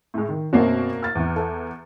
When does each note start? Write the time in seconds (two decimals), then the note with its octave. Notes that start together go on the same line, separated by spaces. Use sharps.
0.14 A2 G#3
0.29 D#3
0.53 F#2 B2 A#3 C4 D4 F#4
1.03 F6 A6
1.15 E2 E3
1.36 A4